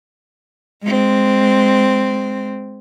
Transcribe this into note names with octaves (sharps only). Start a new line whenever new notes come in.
G#3 C4